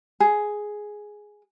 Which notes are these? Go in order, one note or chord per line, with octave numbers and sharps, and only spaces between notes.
G#4